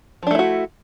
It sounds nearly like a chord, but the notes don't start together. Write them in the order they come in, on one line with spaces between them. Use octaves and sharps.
F3 D4 A3 E4 F#4